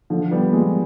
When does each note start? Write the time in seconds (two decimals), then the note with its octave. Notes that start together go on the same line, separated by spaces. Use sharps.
0.10 D3 F3
0.31 G3 B3
0.53 F3 G#3